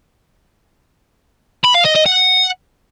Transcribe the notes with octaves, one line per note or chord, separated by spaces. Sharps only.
B5
F5
D#5
D#5
F#5